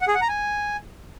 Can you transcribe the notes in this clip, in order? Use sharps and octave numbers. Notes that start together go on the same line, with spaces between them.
F#5
G#4
F#5
A#5
G#5